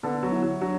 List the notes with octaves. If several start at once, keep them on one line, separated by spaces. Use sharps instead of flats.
D3 B3
F#3
E4
F#3
F#3 D4